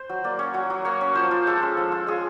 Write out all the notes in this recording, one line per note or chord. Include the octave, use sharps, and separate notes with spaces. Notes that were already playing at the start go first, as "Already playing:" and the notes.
Already playing: C5
F#3
A#3 D5
C#4 C#5
F#3
F#3
A#3 C#5
C#4
F3 C5
F4
G#3 A4
C#4
F3
F4
G#3 G#4